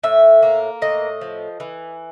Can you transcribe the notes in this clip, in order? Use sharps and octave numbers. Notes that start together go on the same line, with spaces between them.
A2 E5
A#3
A2 D#5
F3
E3